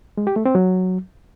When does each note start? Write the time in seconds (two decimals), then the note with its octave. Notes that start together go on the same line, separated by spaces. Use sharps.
0.17 G#3
0.27 G4
0.36 A3
0.46 C4
0.55 F#3